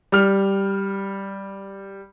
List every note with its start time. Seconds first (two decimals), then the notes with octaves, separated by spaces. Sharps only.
0.12 G3 F6